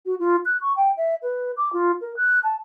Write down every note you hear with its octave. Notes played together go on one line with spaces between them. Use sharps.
F#4
F4
F#6
C#6
G5
E5
B4
D6
F4
A#4
F#6
A5